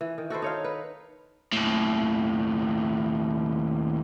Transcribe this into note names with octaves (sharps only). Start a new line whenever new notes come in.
E3
D#3
F#4 A4 B4 C5
D#4 C#5 F5
B4
D#2 A2